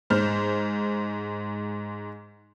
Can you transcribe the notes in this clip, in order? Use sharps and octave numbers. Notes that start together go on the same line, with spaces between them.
G#2 C5 F6